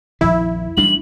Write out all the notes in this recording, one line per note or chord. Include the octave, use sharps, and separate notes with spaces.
A#1 F2 D#3 E4
A1 G3 D4 F#7